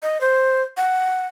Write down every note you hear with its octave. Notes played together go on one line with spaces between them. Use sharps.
D#5
C5
F#5